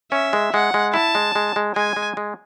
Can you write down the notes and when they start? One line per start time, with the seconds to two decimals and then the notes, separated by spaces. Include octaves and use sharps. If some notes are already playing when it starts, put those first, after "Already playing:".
0.12 C#4 E5
0.33 G#3
0.53 G#3 F#5
0.74 G#3
0.94 E4 A5
1.15 G#3
1.35 G#3
1.56 G#3
1.76 G#3 G#5
1.96 G#3
2.17 G#3